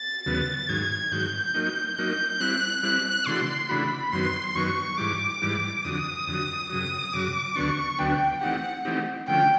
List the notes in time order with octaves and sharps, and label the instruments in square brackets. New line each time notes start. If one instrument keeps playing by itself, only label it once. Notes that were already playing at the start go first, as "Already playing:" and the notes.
Already playing: [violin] A6
[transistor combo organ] D#2 C#3 F#3 B3
[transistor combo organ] G#2 D#3 F#3 [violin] G#6
[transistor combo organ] G#2 D#3 F#3 [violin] G6
[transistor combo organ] F#3 A#3 D#4
[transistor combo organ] F#3 A#3 D#4 [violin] G6
[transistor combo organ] G3 C4 E4 [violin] F#6
[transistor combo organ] G3 C4 E4 [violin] F#6
[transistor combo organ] C#3 E3 A3 D4 F#4 [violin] C6
[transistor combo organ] C#3 E3 A3 D4 F#4 [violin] B5
[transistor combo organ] F#2 D#3 F#3 B3 [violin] C6
[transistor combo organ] F#2 D#3 F#3 B3 [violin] C#6
[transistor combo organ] G#2 E3 G3 [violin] D6
[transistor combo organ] G#2 E3 G3
[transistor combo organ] F2 D3 F#3 [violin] D#6
[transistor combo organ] F2 D3 F#3
[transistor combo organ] F#2 C#3 F#3 [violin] D#6
[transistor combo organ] F#2 C#3 F#3 [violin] D6
[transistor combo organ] D2 D3 F#3 B3 D4 [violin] C#6
[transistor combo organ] D2 D3 F#3 B3 D4 [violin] G5
[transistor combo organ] E3 A3 C4 D#4 G4 [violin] F#5
[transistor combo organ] E3 A3 C4 D#4 G4
[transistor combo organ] D3 F3 A3 C#4 [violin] G5